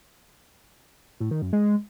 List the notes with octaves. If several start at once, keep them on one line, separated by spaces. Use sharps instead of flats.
A2
D#3
F#2
G#3